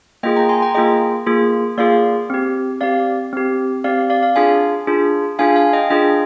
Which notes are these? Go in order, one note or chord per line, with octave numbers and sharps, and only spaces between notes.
A#3 F4 G#4 D#5 G5
G5 A#5
G#5 C6
G5 A#5
A#3 F4 G#4 D#5 G5
A#3 F4 G#4
A#3 F4 G#4 D5 F5
C4 G4
C4 G4 D5 F5
C4 G4
C4 G4 D5 F5
D5 F5
D5 F5
D4 F4 G#4 F5 G#5
D4 F4 G#4
D4 F4 G#4 F5 G#5
F5 G#5
D#5 G5
D4 F4 G#4 D#5 G5